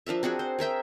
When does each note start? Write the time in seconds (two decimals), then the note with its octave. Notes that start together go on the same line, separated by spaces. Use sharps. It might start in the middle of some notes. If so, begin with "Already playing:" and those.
0.06 F3 D4 A#4 E5
0.23 C4 D4 F#4 G#4
0.39 C5
0.59 G#4 A#4 E5 G5